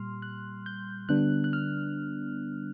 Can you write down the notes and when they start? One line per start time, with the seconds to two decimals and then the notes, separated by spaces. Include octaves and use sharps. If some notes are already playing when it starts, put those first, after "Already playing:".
Already playing: A#2 G3 C6 F6
0.22 F#6
0.66 G6
1.09 D3 G3 B3 D4 F#6
1.44 F#6
1.53 F6